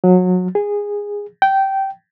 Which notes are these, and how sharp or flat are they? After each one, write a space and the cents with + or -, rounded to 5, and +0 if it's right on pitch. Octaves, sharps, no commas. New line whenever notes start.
F#3 -25
G#4 -15
G5 -15